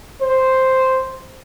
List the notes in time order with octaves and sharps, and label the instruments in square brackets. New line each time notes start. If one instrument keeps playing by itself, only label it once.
[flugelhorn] C5